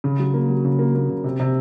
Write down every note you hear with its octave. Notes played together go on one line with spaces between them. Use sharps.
C#3
F#3
A#3
F#3
C#3
A#3
A#3
C#3
C3
C3